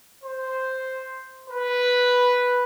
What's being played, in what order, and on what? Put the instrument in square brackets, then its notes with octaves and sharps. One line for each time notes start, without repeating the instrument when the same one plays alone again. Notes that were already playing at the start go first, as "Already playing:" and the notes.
[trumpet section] C5
B4